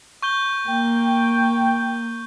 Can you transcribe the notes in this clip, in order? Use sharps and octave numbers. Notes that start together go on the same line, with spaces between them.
C#6 G6 G7
A#3 G5